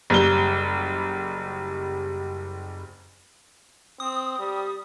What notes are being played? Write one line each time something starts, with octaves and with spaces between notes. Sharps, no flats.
F#1 G3 G7
C4 D#6
G3